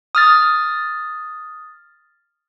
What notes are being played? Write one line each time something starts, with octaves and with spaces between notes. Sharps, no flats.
D#6 F6 A6